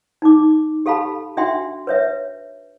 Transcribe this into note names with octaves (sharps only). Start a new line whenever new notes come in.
D#4 D6
G4 A4 F5 A5 B5
D4 F#4 E5 F#5 G5 C6
B4 C#5 E5